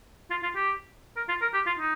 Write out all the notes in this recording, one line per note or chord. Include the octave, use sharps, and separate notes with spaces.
F4
F4
G4
A#4
F4
A#4
G4
F4
D#4